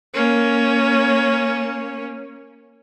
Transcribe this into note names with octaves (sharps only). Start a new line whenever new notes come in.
A#3 C#4